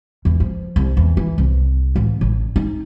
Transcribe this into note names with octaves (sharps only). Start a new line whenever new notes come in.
E2
F3
C2
E2
E3
C2
A1
A1
D#4